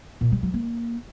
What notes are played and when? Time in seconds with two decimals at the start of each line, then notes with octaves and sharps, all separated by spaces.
0.21 A#2
0.32 G3
0.43 F#3
0.54 A#3